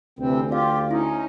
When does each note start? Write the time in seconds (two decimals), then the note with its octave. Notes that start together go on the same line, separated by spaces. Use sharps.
0.19 D2 C3 E3 C4
0.51 F4 G4 D5 F5
0.91 C#4 D#4 E4